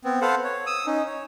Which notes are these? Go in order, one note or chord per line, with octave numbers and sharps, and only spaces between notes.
B3 C4
A4 B4 C5 F5 F#5
C#5
D#6 E6
C#4 D#4
C#5